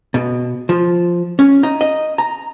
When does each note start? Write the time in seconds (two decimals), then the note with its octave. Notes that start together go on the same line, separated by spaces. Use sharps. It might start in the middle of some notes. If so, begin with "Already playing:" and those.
0.14 B2
0.69 F3
1.39 C#4
1.63 D#4
1.81 D#5
2.18 A#5